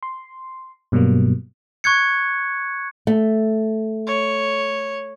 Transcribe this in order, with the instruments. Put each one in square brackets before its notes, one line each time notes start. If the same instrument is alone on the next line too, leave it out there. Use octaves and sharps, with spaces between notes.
[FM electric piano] C6
G2 B2 F#3 G3 A#3
[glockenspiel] C#6 F#6 G#6 C#7
[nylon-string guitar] A3
[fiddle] C#5